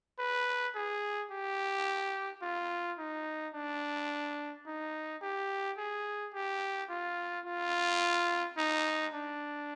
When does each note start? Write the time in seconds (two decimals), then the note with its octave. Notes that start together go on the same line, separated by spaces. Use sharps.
0.19 B4
0.75 G#4
1.31 G4
2.42 F4
2.99 D#4
3.55 D4
4.67 D#4
5.22 G4
5.78 G#4
6.34 G4
6.90 F4
7.46 F4
8.58 D#4
9.13 D4